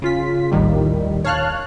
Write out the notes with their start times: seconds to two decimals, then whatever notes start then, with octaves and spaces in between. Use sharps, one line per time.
0.02 C#3 F4 B6
0.52 A#1 D#2 A2 D#3 G3
1.25 C#5 F5 A5 F6 F#6